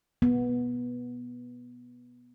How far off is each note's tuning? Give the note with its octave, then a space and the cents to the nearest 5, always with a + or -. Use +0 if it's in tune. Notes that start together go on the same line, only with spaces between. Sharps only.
B3 -10